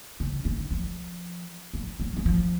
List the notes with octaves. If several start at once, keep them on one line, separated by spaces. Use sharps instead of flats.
C#3
D3
F3
F3
F#3
F#3
F3